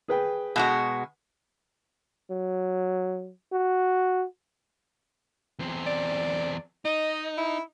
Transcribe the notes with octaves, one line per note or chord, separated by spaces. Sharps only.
G#4 B4 G5
B2 G#3 F#4
F#3
F#4
E2 C4
D5
D#4 D#5
E4